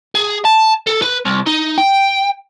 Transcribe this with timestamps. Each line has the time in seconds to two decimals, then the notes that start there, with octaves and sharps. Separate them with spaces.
0.15 G#4
0.45 A5
0.87 A4
1.02 B4
1.26 C2
1.47 D#4
1.78 G5